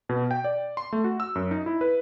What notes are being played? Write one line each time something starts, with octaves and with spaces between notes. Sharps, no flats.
B2
G5
D5
C6
A3
F#4
E6
F#2
D#4
E4
B4